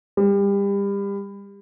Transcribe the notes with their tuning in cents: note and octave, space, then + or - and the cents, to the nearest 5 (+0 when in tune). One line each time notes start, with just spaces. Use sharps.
G3 +30